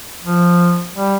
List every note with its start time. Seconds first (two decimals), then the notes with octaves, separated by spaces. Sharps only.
0.23 F3
0.95 G3